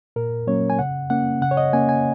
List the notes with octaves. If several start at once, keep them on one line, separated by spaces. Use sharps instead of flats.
A#2 A#4
F#3 A#3 C#4 C#5
G#5
C#3 F#5
A#3 C#4 F#5
C#3 F#5
C#5
D#5
A#3 C#4 G#5
G#5